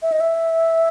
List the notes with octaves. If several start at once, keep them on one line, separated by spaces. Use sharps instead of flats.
E5
D#5
E5